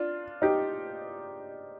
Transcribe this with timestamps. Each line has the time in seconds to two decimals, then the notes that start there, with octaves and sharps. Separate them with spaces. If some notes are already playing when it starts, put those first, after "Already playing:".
Already playing: D4 F4
0.42 D#4 G4